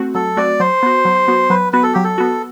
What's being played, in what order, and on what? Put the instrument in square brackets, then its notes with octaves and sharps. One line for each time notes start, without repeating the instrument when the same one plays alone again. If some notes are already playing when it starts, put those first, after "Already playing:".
Already playing: [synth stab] A3 C4 F#4
[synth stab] F#3 [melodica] A4
[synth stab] A3 C4 F#4 [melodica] D5
[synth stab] F#3 [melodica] C5
[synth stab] B3 F#4
F#3
B3 F#4
[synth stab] F#3 [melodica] B4
[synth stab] B3 F#4 [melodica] B4
[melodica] A4
[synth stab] F#3 [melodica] G4
[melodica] A4
[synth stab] B3 F#4